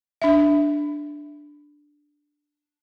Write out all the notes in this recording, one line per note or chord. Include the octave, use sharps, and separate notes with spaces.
D4 E5